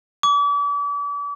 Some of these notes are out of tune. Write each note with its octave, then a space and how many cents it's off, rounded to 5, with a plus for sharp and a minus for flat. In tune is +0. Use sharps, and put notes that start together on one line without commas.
D6 -40